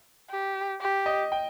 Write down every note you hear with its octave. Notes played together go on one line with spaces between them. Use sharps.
G4
G4
D#5
G5